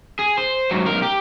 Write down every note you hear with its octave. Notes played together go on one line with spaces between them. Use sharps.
G#4
C5
G#2 F#3
B1 A#4
G4